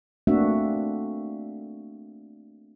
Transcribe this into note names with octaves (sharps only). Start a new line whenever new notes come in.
A3 A#3 C4 D4 F#4 E5